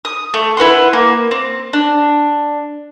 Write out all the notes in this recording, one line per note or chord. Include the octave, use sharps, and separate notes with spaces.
D#6
A3
E4 B4 F#5 C6
A#3
C4
D4